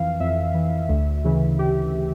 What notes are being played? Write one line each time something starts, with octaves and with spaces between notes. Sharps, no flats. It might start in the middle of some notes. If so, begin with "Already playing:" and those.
Already playing: F2 E3 F5
F2 E5
E3
D2
C#3 E3
G4